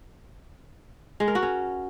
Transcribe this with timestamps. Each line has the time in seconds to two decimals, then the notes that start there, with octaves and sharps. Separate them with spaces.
1.20 G#3
1.28 A#4
1.35 F#4
1.43 C#4